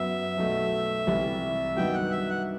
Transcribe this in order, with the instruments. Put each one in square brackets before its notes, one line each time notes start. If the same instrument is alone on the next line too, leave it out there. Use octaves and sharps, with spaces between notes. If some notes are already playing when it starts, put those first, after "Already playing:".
Already playing: [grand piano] F#2 F#3 B3 [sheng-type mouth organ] E5
[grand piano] B1 B2 A3
C2 C3 E3 G3
[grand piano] G2 D#3 F#3 B3 [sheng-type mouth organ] G5
[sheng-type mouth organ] F#5
E5
F#5